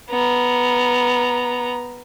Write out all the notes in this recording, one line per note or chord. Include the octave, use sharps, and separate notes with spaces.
B3 A#5